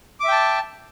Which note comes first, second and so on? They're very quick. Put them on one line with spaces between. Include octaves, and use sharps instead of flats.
D6 E5 G5 A5